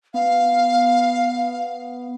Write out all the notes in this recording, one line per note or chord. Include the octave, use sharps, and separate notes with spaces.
B3 F5